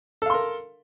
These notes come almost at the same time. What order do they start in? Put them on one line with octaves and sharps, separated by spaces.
A4 F5 C6 A#4